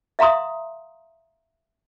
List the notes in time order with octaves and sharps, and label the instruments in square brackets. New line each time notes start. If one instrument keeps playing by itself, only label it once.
[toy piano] E5 F5 A#5 C6 D#6